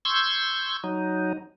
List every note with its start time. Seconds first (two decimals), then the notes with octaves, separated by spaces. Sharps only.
0.05 C6 C#6 E6 G6 G#6
0.84 F#3 D#4